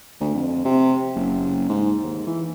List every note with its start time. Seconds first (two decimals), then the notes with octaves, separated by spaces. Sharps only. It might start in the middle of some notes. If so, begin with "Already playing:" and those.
0.20 D2
0.34 F2
0.65 C3
1.15 F#1
1.69 G#2
2.03 D#2
2.27 E3